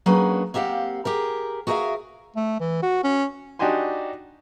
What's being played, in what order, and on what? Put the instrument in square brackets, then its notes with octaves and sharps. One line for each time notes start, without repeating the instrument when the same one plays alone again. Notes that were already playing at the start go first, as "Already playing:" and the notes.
[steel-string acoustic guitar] F#3 A#3 C#4 D4 G#4 B4
A#3 C4 G4 F5 F#5
G4 G#4 A#4
F#4 G#4 A#4 B4 E5 F5
[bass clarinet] A3
E3
F#4
C#4
[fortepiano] D4 D#4 F#4 G4 G#5 C6